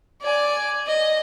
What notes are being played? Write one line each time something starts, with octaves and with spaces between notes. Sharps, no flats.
D5 G#5
D#5